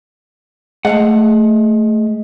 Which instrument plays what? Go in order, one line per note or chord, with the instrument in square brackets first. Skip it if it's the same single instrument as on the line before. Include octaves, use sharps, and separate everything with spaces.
[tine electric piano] G#3 G#4 D#5 [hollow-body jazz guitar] A3 F5 F#5